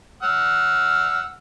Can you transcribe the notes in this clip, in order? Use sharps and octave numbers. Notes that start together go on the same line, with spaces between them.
F#5 E6 F6